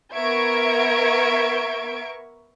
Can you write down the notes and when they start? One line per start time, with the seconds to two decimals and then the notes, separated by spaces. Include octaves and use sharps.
0.14 B3 A#4 E5 C#6 G#6 D7